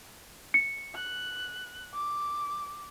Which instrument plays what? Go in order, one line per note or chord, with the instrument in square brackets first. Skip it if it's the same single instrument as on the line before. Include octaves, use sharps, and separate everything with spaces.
[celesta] C#7
[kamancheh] F#6
D6